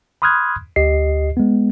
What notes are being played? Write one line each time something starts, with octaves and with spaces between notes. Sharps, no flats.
B5 C6 D#6 F6 F#6 G#6
D2 G4 D#5 C7
G#3 B3